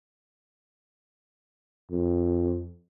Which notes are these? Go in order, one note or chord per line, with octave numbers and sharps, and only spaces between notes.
F2